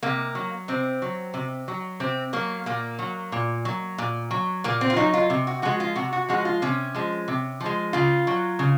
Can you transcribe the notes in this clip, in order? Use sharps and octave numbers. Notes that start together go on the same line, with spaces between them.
C3 A#3
F#3
C3 C4
F#3
C3
F#3
C3 C4
F#3 A#3
A#2 A#3
F#3
A#2
F#3
A#2
F#3
A#2 A#3
C4
F4
F#3 D#4
F4
C3
F#4
F3 G#3 F#4
F4
C3 F#4
F#4
F3 G#3 F#4
F4
C3 C#4
F3 G#3
C3
F3
G#3
C#3 F4
F#3
C#3